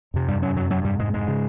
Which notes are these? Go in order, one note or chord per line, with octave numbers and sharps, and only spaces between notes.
F2 C3
G2 G3
F#2 F#3
F#2 F#3
F#2 F#3
G2 G3
G#2 G#3
G#2 G#3
C#3